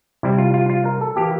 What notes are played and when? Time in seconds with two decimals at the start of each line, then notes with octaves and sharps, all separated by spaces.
0.23 C3 G3 C4 E4
0.38 F4
0.54 F4
0.70 F4
0.85 A#4
1.01 A4
1.17 E3 A#3 G4